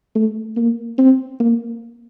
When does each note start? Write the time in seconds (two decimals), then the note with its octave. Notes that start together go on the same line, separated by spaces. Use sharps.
0.15 A3
0.57 A#3
0.98 C4
1.40 A#3